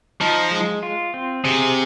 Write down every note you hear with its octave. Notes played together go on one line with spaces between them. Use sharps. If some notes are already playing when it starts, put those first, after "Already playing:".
F3 D#4
G#3
F4
C4
C3 G#4